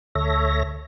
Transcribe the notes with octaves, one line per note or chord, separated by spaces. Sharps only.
D2 A4 C#5 E5 A#6